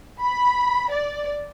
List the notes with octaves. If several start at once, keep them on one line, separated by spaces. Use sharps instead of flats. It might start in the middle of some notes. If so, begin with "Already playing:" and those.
B5
D5